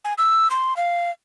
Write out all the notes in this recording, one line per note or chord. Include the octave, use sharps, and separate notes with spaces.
G#5
E6
C6
F5